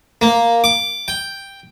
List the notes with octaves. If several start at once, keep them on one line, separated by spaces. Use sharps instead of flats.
A#3
D6
G5